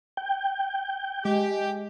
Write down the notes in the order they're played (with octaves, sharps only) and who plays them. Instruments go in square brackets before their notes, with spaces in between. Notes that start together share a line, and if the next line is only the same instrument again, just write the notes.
[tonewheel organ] G5
[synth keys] G#3 [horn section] G4